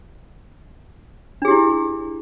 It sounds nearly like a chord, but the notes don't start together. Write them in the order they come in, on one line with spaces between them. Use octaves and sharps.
D4 G#4 G4 E4